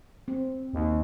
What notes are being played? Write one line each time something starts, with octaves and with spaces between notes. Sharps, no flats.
C4
D#2